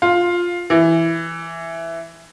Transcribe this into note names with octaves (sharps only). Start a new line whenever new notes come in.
F4
E3